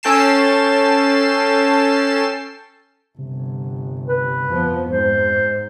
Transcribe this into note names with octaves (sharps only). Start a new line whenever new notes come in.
C#4 A4 G5 A5 C7 E7
G1 C3
B4
F2 F3 B3
G#2 C5